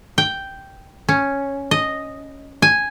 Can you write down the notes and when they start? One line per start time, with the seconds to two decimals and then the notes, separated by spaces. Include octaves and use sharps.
0.18 G5
1.09 C#4
1.71 D#5
2.62 G#5